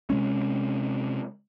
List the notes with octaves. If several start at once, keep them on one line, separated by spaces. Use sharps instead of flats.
C3 G#3 C#4